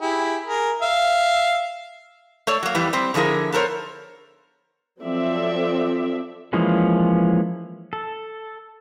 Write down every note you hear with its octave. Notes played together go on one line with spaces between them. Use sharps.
E4 G4 G#4
G#4 A#4
E5 F5
A3 A4 C#5 D5
F#3 A#3
F2 E3 G3
G3 C4
D3 F3 E4 G#4 A#4
B3 A4 A#4 C5 C#5
F3 F#3 C4 A4 D5 E5
E3 F3 G#3 A#3 C#4
A4